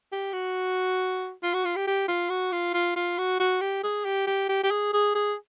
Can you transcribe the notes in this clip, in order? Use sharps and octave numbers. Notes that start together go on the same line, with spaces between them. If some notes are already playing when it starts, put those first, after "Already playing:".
G4
F#4
F4
F#4
F4
G4
G4
F4
F#4
F4
F4
F4
F#4
F#4
G4
G#4
G4
G4
G4
G4
G#4
G#4
G#4